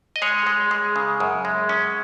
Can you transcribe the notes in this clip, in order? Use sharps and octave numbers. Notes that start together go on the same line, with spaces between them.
D#5
G#3 G#4 C#5
G#3
G#3
C#3
F#2
G#3
C#4